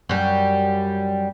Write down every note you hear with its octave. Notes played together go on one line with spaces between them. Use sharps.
F#2 G3